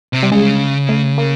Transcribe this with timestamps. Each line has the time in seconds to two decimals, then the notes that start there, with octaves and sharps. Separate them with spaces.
0.13 C3
0.23 G3
0.31 C#3 G#3
0.89 A3
1.18 A#3